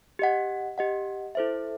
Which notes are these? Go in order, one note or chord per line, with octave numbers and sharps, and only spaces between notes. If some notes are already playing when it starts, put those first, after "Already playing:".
G4 D#5 F#5
G4 D#5 F#5
E4 A4 C5 E5